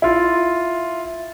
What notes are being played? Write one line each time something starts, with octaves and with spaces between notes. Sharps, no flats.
E4 F4